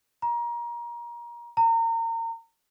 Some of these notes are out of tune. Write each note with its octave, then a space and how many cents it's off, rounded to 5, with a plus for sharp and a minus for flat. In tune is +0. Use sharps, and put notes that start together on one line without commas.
A#5 +25
A#5 -30